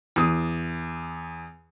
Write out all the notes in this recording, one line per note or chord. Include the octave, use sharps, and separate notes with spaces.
E2 D#6